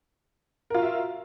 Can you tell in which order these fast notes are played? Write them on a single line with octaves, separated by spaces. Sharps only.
A#4 F4 F#4 E5